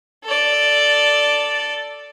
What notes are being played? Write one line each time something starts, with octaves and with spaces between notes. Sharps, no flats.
A4 D5